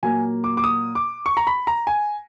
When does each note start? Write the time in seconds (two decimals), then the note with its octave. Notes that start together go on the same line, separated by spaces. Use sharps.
0.03 A#2 F#3 A#3 G#5
0.44 D6
0.57 D6
0.64 D#6
0.95 D6
1.26 C#6
1.37 A#5
1.47 B5
1.67 A#5
1.87 G#5